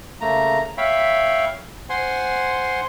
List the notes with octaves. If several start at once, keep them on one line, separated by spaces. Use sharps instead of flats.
C#3 A3 A#3 A#5
C#5 E5 F5 G5 B5
C5 F#5 G#5 C6